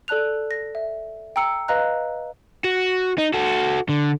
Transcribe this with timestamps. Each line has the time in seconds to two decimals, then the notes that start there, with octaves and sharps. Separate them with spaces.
0.08 A4 D5 A5 F#6 F7
0.51 A#6
0.75 E5
1.36 G5 A#5 E6 C#7
1.68 B4 D#5 F5 A#5 F#6
2.65 F#4
3.18 D#4
3.34 F#4 A4
3.89 D3